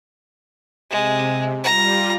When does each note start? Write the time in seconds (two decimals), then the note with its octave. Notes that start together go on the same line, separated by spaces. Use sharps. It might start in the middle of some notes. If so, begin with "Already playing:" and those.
0.91 C3 G#3
1.64 G3 F4 A#5